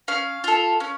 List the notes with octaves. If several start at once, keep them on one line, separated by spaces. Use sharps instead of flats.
C#4 F5
F4 A4
C#4